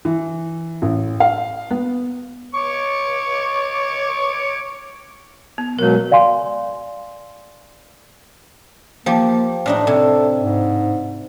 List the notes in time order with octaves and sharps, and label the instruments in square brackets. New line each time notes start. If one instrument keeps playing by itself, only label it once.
[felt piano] E3
A1
F5
B3
[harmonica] C#5 C#6 D6
[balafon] B3
[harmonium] B2 F#3 [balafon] G#3 A#4
[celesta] D5 F5 G#5 C6
[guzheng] F3 G4 [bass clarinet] A#3
[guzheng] A2 D4 D#4
[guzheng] C3 [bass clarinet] A4
[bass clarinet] G#2